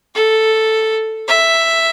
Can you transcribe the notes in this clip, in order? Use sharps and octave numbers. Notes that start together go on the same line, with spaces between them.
A4
E5